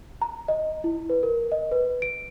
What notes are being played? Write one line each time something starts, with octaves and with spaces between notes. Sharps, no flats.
A#5
D#5
E4
B4
A#4
D#5
B4
D7